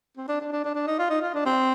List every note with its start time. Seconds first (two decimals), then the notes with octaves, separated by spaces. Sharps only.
0.17 C4
0.28 D4
0.40 D4
0.52 D4
0.64 D4
0.75 D4
0.87 D#4
0.99 F4
1.10 D#4
1.22 F4
1.34 D4
1.46 C4